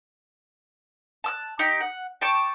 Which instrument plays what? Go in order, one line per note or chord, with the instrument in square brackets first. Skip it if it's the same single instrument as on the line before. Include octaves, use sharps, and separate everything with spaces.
[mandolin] A5 E6 F#6
D#4 G4
F#5
G5 A5 C#6 D6